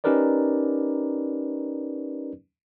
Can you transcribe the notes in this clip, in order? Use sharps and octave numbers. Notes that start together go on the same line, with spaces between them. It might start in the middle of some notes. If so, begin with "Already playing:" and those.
C#4 D#4 G4 A#4 B4 D5